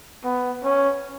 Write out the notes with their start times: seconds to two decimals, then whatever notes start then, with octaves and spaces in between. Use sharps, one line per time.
0.24 B3
0.64 C#4